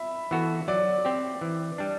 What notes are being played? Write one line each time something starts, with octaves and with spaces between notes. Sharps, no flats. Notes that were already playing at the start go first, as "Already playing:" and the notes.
Already playing: E5 B5
E3 B3 F#4 A4
F#3 D5
C4 G4
E3
G3 D4